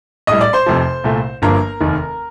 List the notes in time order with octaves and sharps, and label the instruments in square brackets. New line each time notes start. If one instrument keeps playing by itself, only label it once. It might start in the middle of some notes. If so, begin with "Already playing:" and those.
[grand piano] A#1 A2 G3 D#5 D#6
D5 D6
C5 C6
F1 F2 C3 F3
C2 A#2 A3
G1 G2 F3 A#3 A#4 A#5
F1 D#2 D#3